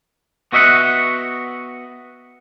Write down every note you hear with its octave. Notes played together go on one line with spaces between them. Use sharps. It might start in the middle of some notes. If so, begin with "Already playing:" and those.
B3 F#4 D#5 E5 F#5